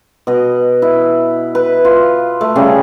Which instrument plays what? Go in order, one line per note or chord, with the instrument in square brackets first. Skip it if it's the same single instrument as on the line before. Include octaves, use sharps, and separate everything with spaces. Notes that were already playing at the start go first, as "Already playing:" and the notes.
[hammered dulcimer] B2 D#5
E4
B4
F4
A3
C#3 G3 C#4 G#4